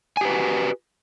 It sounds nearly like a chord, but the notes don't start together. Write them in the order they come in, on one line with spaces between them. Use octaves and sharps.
G#5 G4 B4 F#4